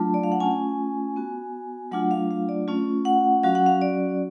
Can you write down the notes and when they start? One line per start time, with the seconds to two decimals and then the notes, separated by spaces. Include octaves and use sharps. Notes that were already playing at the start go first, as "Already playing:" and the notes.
Already playing: F#3 A3 D4 F4 A5
0.14 D5
0.24 F5
0.32 F#5
0.40 A3 C#4 F4 G#5
1.16 B3 F#4
1.92 F#3 A3 D4 F4 F#5
2.11 F5
2.31 F5
2.49 D5
2.68 A3 C#4 F4
3.05 F#5
3.43 F#3 C#4 F#4 F5
3.55 F#5
3.66 F5
3.81 D5